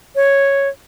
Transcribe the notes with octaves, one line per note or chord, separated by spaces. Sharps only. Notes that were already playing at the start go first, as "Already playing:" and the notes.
C#5